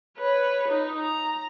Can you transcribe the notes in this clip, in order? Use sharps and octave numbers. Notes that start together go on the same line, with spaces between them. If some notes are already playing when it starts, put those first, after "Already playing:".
B4 C#5
D#4
A#5